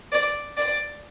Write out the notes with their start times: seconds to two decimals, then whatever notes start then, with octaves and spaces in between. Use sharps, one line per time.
0.12 D5
0.57 D5